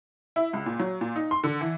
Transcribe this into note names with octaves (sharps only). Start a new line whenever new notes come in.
E4
C#2
A#2
F#3
A#2
D#4
C6
D3
E3